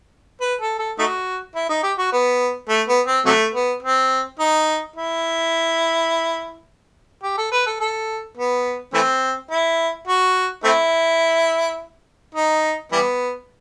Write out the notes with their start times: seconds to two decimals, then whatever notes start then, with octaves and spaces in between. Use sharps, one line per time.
0.41 B4
0.61 A4
0.79 A4
0.99 A3 D#4 F#4
1.55 E4
1.69 D#4
1.83 G4
1.98 F#4
2.12 B3
2.69 A3
2.88 B3
3.07 C4
3.26 C3 F#3 A3
3.54 B3
3.83 C4
4.39 D#4
4.96 E4
7.23 G4
7.37 A4
7.52 B4
7.67 A4
7.80 A4
8.37 B3
8.94 E3 A3 C4
9.51 E4
10.07 F#4
10.64 A3 C4 E4
12.35 D#4
12.92 E3 G3 B3